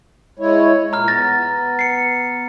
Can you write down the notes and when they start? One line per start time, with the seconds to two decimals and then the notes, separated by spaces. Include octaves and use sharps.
0.39 G#3 E4 C#5
0.93 A#2 A#5 F6
1.08 B3 A6 A#6
1.79 C7 C#7